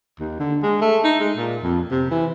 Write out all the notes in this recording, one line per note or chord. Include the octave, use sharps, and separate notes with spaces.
D#2
D3
G#3
A3
D#4
G#3
A#2
F2
C3
E3